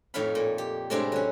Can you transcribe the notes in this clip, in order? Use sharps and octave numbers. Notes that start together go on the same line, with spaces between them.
F2 A2 D#4 C#5 F5 B5
A#2
G4
A2 C3 G#3 C4 D4 E4
F#3 C#4